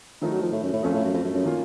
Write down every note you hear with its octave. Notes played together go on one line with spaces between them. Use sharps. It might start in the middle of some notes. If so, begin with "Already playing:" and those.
D#3 F3 A3 D#4
F#3
F3
A2
F#2
A2
F2 F3 A3 C#4 F4
A2
F#2
F2
F#2
F#2
D#3 A#3 C#4 F4